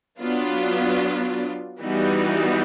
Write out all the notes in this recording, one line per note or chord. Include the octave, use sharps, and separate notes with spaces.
F#3 B3 D4 F4
E3 G3 B3 D#4 F#4